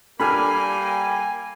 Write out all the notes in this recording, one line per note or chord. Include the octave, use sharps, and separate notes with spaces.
G3 A#3 D4 A4 G#5 B5 F6